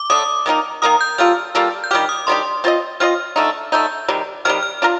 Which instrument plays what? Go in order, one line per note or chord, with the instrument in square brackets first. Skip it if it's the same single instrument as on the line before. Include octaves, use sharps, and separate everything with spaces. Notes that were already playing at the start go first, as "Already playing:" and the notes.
Already playing: [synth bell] D6
[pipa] D3 A3 D4 [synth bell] D#6
[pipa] D#3 A#3 D#4 A#4
[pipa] D#3 A#3 D#4 A#4 [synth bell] D#6
[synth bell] G6
[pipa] G3 A#3 F4 A4 [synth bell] F6
[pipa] G3 A#3 F4 A4
[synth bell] G6
[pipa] D#3 G3 D4 G4 [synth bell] F6
[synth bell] D#6
[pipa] D#3 G3 D4 G4 [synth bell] C6
[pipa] C4 F4 C5 D#5
[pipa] C4 F4 C5 D#5 [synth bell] F6
[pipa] D3 A3 D#4
[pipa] D3 A3 D#4 [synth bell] G6
[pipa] C3 D#3 G3
[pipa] C3 D#3 G3 [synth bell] F6
[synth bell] F6
[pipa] D4 F4 A#4